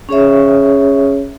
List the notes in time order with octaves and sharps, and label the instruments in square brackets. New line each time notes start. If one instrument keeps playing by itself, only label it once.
[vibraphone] C#4 G#4 C#5 E5